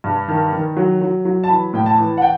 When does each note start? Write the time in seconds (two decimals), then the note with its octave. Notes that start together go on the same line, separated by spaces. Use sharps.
0.04 G2
0.28 D#3
0.53 D#3
0.77 F#3
1.01 F#3
1.25 F#3
1.44 A5
1.49 E3 B5
1.73 A2 G5
1.86 A5
1.98 E3
2.17 F#5
2.22 G5